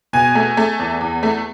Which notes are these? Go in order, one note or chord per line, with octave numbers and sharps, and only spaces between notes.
B2 G#5
A3
A3
E2
E2
A3